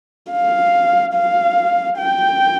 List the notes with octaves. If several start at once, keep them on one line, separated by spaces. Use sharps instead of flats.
F5
F5
G5